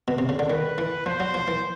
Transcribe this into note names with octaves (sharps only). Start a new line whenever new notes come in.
B2
C3
C#3
D3
D#3 B4
E3
F3 C5
F#3
F3
E3